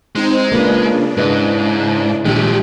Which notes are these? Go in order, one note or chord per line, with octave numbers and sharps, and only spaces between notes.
G#3 C4 D#4 C5
C#3 A#3 D4 F4 B4
G#2 E4 B4 D#5
A#1 G#3 A3 G4